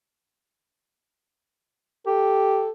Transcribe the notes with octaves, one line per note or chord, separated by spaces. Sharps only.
G4 A4